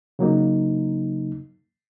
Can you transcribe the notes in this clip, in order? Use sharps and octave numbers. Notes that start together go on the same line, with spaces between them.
C#3 F#3 A#3 D#4